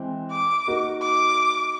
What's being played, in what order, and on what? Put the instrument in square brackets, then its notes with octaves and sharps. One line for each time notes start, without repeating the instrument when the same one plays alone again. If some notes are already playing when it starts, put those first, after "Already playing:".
Already playing: [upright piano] E3 G#3 C4
[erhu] D6
[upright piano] A#3 D#4 F#4 A#4
[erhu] D6